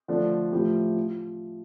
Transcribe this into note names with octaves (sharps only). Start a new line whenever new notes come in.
D3 F3 A3 D4
A2 F3 A3 E4 G4
F4